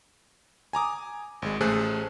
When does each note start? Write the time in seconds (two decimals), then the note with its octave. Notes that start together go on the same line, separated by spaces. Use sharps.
0.73 G#5 A#5 D6 D#6
1.42 G#1 G#3
1.61 A1 A3 G#4 A4 C5 F#6